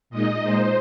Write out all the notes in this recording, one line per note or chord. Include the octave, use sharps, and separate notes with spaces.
A#2 G#3 D#4 D#5
A#2 G#3 D#4 C5